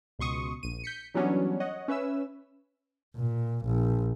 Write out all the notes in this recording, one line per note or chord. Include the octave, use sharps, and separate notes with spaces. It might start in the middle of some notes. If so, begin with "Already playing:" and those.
C#2 B2 C6 C#6 D#6
A#1 D#7
G6 B6 C#7
E3 F#3 G3 B3 C#4 D4
C#5 D#5 F#5
C#4 B4 E5 E6
A#2
A#1